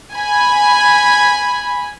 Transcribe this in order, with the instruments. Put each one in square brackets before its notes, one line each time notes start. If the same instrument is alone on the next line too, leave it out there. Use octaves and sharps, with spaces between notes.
[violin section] G#5 B5